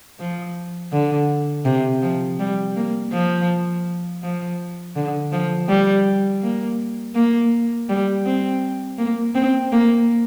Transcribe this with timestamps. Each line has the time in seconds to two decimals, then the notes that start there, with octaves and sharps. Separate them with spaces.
0.19 F3
0.92 D3
1.65 C3
2.02 F3
2.39 G3
2.76 A#3
3.12 F3
4.23 F3
4.96 D3
5.32 F3
5.68 G3
6.42 A#3
7.15 A#3
7.89 G3
8.26 C4
8.98 A#3
9.35 C4
9.72 A#3